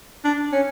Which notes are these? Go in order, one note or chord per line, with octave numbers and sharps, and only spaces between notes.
D4
C#4